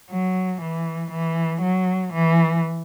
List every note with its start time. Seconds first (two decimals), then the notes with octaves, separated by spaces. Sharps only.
0.10 F#3
0.62 E3
1.11 E3
1.62 F#3
2.13 E3